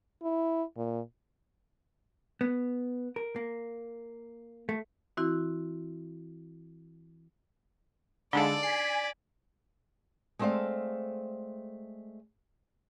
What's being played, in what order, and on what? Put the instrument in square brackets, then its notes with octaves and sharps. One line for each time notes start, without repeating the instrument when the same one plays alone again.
[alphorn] E4
A#2
[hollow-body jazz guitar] B3
A#4
A#3
A3
[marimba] E3 C4 E4 F#4
[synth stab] D3 G#3 A4 [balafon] D4 D#4 F5 [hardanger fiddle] D5
[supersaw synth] G#5 B6 [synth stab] C7
[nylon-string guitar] G#3 A3 C4 C5 D5 F5